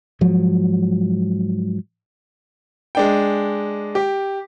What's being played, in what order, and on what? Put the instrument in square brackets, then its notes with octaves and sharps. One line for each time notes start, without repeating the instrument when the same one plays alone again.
[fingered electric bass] G#2 F3 F#3
[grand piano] G#3 D4 G5
G4